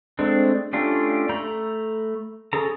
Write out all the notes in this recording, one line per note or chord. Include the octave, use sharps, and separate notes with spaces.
G#3 A3 C4 D4
A3 C#4 D4 F4 G4
A3 A#5 B5 G6
C#4 G#4 A4 A#5